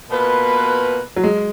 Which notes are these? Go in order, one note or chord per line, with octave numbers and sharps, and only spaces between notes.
B2 A#3 F4 B4
F#3
G#3